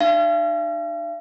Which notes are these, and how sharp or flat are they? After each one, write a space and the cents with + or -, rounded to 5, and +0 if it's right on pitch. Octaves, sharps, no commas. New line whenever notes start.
D4 +45 F5 -45